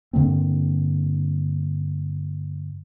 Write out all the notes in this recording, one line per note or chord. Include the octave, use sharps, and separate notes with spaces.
G2 D3 A#3 C4